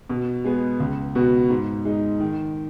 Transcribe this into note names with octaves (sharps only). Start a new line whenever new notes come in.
B2
G#3 B3 G#4
C#2
B2 B3 F#4
G#2
G#3 D#4
D#3